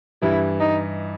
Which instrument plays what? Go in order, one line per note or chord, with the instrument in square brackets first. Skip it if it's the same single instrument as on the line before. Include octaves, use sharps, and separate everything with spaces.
[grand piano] G2 E3 G3 [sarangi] E4
[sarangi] D#4